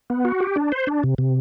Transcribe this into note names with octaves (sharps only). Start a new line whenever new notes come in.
B3
F#4
G4
D4
C5
D4
C3
C3